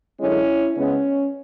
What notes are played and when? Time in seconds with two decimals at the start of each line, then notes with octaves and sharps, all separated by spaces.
0.19 F#2 D3 G#3 C#4 E4
0.76 C#3 G#3 B3 C#4